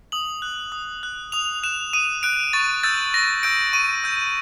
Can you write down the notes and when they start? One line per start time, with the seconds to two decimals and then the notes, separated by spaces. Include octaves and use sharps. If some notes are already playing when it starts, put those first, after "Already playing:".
0.12 D#6 F#7
0.42 F#6
0.72 D#6
1.03 F#6
1.32 D#6 F7
1.63 F#6 E7
1.93 D#6 D#7
2.23 F#6 D7
2.53 C#6 A6
2.83 E6 G6 A6
3.14 C#6 A#6
3.43 E6 G6 D7
3.73 C#6 D#7
4.04 E6 G6